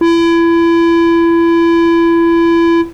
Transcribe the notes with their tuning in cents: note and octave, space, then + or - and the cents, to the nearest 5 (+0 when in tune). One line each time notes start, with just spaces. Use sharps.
E4 +30